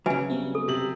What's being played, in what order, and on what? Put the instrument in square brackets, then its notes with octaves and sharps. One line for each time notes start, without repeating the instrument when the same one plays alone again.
[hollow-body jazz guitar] C#3 F#3 [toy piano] B4 E5 G#5
[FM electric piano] G3 B3 C4
[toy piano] A4
[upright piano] C3 F#7